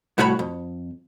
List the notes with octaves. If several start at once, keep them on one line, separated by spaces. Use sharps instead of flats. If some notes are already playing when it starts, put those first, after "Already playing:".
C2 A2 F#4 C#5 B5
F2